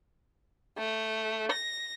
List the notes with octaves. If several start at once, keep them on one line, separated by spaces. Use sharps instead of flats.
A3
A#6